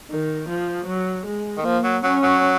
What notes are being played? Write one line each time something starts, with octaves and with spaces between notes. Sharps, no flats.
D#3
F3
F#3
G#3
D#3
F3 A#3
F#3
F#3 C#4
F#3